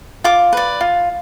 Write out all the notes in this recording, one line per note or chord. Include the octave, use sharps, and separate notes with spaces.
F4 D6
B4 D5
F4